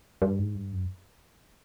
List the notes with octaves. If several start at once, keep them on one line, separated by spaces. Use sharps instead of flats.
G2
G#2
G2
F#2